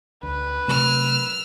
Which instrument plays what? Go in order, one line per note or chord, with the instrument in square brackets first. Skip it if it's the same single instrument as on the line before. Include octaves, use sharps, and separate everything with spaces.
[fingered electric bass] D2 [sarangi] B4
[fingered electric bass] C3 F#3 A3 [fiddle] E6 F6